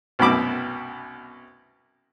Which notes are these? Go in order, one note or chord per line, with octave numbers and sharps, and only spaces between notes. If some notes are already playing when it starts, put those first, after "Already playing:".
C2 F#2 B2 B5 D6